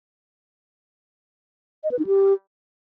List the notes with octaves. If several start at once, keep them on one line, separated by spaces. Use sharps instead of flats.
D#5
B4
D#4
G4